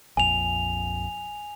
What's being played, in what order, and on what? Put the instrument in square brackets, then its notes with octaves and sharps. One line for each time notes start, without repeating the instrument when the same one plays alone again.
[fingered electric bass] A#1 F2 [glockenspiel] G#5 F7